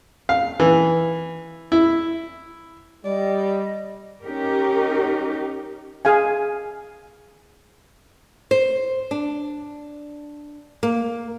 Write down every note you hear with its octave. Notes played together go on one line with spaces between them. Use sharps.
F5
E3
E4
G3 D5 D#5
C#4 D#4 G4 A#4
G#4 F5 G#5
C5
D4
A#3